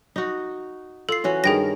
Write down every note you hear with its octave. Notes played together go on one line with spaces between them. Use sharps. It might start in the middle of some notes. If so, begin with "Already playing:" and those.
D#4 F#4
F4 A4 C7
E3 C#4 F#4
G2 D#3 G#4 A#4 G5 A#6